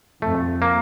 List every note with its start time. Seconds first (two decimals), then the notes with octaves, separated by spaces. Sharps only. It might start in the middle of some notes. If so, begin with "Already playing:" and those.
0.22 F2 A3
0.62 A#3